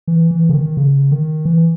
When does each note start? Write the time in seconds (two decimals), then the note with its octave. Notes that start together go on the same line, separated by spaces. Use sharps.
0.08 E3
0.31 E3
0.49 C#3
0.54 D#3
0.77 C#3
1.11 D#3
1.45 E3